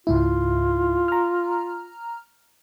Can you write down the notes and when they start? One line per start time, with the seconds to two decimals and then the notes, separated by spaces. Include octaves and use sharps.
0.07 C#2 G#2 E4 F4
1.08 A#5 F6